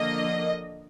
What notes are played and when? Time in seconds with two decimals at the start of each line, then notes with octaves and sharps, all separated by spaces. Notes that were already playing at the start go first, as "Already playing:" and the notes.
Already playing: D3 F3 A#3 D#5